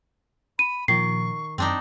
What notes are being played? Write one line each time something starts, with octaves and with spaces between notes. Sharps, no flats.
B5 D#7
A#2 D#3 F3 C#6 C7
F#2 C4 D4 D#4